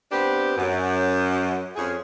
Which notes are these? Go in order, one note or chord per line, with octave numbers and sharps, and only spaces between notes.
B3 C4 D4 G4
F#2
F2 C#4 G#4